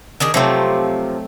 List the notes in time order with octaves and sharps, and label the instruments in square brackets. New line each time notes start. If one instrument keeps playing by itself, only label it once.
[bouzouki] D#3 D4 G#4
[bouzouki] C3 F3 [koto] F#3 A3 C4